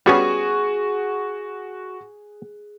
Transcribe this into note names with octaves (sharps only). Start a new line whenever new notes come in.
G3 B3 C#4 F#4 G#4 C#6